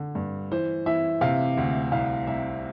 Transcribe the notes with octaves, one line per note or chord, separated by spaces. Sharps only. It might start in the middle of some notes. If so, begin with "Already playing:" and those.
Already playing: D3
G2
E3 C5
E3 E5
C3 F5
D2
C2 F5
C2 E5